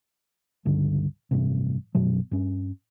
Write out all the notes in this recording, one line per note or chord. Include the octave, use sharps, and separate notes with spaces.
C#2 G2 D3
A1 G2 C3
A#1 F#2 B2 F#3
G2 C#4